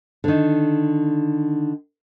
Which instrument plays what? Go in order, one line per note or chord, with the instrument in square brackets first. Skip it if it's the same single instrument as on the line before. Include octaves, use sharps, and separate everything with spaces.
[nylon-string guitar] D3 D#3